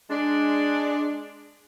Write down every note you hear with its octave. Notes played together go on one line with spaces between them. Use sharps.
G#3 D4